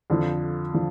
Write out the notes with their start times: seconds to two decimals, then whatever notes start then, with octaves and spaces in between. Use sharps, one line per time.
0.10 F2 D3 F3
0.74 D3 F3